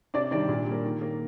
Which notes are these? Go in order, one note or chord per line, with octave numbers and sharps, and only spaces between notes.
C3 D4 D5
D#3 G3 D4 D5
A#2
G3 A#3
D#3
A#3